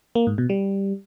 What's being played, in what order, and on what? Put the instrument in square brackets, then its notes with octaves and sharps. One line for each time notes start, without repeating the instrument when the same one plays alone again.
[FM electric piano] A#3
G#2
B2
G3